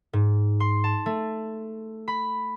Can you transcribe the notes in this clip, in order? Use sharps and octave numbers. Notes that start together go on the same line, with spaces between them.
G#2
C6
A5
A3
B5